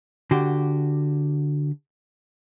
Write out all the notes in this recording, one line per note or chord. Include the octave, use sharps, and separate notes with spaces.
D3 F#4 G4